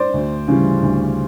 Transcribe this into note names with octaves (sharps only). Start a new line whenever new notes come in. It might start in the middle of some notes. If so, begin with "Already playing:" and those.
Already playing: C5 D5
D2
C#3 E3 G3
D2